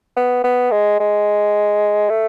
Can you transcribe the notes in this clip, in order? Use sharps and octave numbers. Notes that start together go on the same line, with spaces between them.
B3
B3
G#3
G#3
A3